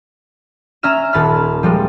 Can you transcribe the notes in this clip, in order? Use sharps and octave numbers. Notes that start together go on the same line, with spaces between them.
C#4 E5 A#5 F6 E7
D#1 A5 B5 F6
F3 G3 G#3